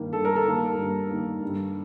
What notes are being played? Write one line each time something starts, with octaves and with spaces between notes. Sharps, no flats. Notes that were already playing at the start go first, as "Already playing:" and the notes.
Already playing: G2 D#3 A#3
G2 A4
A#4
A4
D#3 A#3
G2
D#3 A#3
G2